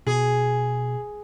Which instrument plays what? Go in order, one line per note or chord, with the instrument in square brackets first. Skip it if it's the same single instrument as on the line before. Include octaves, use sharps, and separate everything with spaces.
[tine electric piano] B2 [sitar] G#4